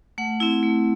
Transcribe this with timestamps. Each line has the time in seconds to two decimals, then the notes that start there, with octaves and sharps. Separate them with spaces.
0.18 A3 F#5
0.40 C4 E4
0.63 A3